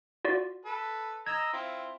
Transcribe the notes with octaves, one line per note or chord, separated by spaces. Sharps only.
F4 F#4 D5
A4 B4
D#5 A#5 E6 G#6
C4 E4 F4